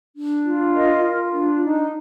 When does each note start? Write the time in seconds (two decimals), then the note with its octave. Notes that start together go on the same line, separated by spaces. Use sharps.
0.16 D4
0.45 F4
0.74 A#4 D#5
1.04 F4
1.33 D4
1.63 D#4